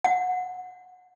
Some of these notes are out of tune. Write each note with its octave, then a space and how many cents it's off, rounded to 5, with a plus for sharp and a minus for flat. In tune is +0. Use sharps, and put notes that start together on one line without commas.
F#5 -20